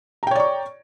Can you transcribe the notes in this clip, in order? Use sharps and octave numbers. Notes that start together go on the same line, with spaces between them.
C#5 D5 G5 A#5 C#6